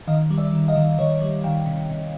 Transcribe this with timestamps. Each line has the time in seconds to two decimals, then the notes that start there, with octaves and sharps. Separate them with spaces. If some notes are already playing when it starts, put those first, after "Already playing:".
0.08 D#3 D#5 F5
0.31 G3
0.38 D5 E5
0.53 D#3
0.68 D#5 F5
0.76 D#3
0.99 D#3 C#5 D#5
1.21 G3
1.44 D#3 F5 G5
1.66 C3
1.90 C3